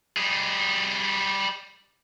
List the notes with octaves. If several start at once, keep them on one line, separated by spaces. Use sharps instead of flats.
G3 G#4